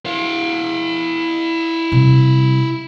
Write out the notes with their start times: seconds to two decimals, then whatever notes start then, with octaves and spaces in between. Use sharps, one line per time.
0.06 E4 F5
1.92 C3 G3